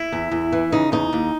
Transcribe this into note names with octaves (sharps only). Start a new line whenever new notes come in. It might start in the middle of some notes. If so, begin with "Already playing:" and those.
Already playing: E4
E2
E2
E3
C#3 D#4
E2 D#4
D#2